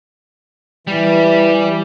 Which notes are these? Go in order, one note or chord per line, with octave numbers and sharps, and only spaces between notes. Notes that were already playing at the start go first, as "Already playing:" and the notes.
E3 G3